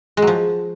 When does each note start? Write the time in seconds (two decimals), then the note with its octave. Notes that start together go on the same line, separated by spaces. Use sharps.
0.17 G#3
0.22 F#3
0.27 F3